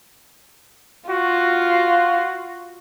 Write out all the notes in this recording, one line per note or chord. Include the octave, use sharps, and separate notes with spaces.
F4 F#4